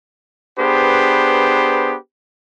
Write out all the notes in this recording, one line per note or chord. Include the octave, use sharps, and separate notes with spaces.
B3 D4 G4 G#4 B4 C5